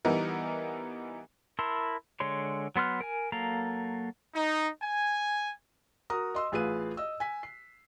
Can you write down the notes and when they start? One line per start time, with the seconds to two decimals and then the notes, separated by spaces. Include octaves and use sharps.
0.05 E3 G3 B3 D#4 A#4
1.59 E4 A#4 A5 C6
2.20 D3 G#3 C#5 C6
2.76 F#3 B3 C6 F6 F#6
3.01 A#4 G#5
3.32 F#3 A#3 A4 F5 A#5
4.34 D#4
4.81 G#5
6.10 F#4 A#4 A#5 D#6
6.35 D#5 C6 E6
6.52 A1 F4 G#4 B4 F5 D#7
6.97 D#5 E6
7.20 G#5 B6
7.43 C7